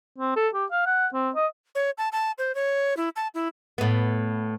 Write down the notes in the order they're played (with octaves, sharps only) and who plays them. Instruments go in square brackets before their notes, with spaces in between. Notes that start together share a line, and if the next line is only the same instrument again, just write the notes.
[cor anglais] C4
A4
G4
F5
F#5
C4
D#5
[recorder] C#5
A5
A5
C5
C#5
E4
A5
E4
[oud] A2 B3